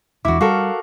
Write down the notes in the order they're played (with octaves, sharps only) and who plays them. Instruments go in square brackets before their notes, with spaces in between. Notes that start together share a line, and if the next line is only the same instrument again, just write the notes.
[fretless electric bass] E1 E2 [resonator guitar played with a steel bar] E4 F#4 [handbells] D6
[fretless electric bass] G3 [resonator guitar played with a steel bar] F#4 A4 A#4 [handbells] F5 C#6 D6